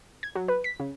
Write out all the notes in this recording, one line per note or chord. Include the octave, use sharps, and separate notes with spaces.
G#6
F#3
B4
B6
C#3